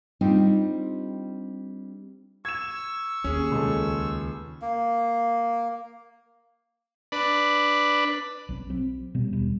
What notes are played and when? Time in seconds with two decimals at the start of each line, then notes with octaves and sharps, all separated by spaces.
0.21 G3 C4 D4 D#4 F4 G4
2.45 C#6 E6 G#6 E7
3.24 D#2 C#4 G#4
3.52 C#2 A4
4.62 A#3
7.12 D4 B4
8.49 B1 C4 C#4
8.70 F#3 C4
9.15 B2 G3 B3
9.33 D#1 C2 G3